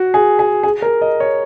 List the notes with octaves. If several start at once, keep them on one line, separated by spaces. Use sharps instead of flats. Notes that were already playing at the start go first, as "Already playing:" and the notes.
Already playing: F#4
G#4
G#4
G#4
A#4
D#5
C#5